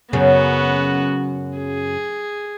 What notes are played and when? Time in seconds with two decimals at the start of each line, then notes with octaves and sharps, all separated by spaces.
0.13 F#2 C#3 B3 F#4
1.58 G#4